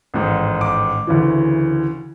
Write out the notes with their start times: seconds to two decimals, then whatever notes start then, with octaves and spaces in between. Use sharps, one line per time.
0.14 A1 G#2 D#3
0.61 D6
1.07 D2 C#3 E3